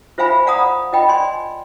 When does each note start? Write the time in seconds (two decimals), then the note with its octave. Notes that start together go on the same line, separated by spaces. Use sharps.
0.18 F4 C5 E5 F5 G#5 B5
0.47 D5 F5 F#5 A#5 B5 D#6
0.93 F4 D#5 G5 B5
1.08 D5 G#5 C6